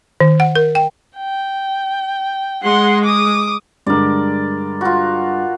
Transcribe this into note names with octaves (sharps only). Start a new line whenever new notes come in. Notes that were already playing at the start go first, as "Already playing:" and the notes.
D#3
F#5
A#4
G5
G5
G#3 F#5 C6
D6 D#6
G2 D3 G#3 A#4 D5
F4 F#4